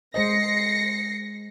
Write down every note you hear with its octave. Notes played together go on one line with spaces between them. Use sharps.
G#3 C5 D#5 A#6 C7 C#7